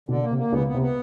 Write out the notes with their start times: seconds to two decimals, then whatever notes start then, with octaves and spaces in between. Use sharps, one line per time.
0.09 B2 D3
0.23 A#3
0.30 C3
0.38 A#3
0.52 C#2 C#3 B3
0.67 B3
0.74 C3
0.82 B3